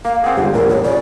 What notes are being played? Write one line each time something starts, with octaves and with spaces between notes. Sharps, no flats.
A#3 F5
C4 G#4 F#5
G1 C#2 G4
A#1 E2 A#2 A#4
C#5
C#3 D5